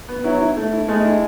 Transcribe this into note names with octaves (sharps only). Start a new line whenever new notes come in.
B3
F#3 E4
E4
A3
E4
G#3 A3
E4